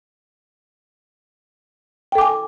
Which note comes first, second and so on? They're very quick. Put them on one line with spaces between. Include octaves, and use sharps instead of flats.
G5 A4 D6 G#5